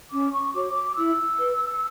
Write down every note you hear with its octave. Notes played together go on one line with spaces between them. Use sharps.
C#4 D6
C#6
F#4 C#5 D6
D6
E4 E6
B4